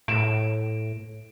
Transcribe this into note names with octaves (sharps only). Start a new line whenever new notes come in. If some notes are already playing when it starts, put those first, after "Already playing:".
A2 D7 E7